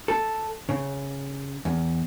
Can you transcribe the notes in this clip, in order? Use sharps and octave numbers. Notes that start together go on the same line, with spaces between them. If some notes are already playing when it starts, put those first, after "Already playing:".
A4
C#3
E2